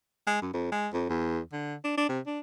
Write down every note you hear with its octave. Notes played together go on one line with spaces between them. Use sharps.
G#3
F#2
F2
G#3
F2
E2
D3
D4
D4
C3
D4